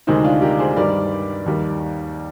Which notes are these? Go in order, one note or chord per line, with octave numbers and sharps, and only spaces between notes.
D2 C3 D#3 G#3 C4 D#4
D4 F4
G4 A#4
G#4 C5
G2 D#3 G3 A#4 D5
D#2 D#3 G3